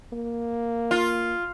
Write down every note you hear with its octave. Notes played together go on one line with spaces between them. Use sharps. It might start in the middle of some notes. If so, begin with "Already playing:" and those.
A#3
F4